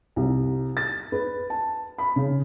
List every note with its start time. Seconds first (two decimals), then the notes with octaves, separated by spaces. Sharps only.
0.16 C2
0.77 A6
1.12 B4
1.50 A5
1.98 B5
2.16 C#3